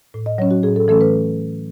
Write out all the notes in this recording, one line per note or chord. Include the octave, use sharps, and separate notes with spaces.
A2
D#5
F#3 C#4 C#5
F#4
A2 G#4
A4
E3 A3 C#4 A4
B4